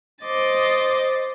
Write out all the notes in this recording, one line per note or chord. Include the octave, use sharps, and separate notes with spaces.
C5 D#5 D6 A6